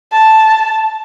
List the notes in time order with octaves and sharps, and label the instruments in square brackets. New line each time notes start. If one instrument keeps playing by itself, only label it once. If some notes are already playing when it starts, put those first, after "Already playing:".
[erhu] A5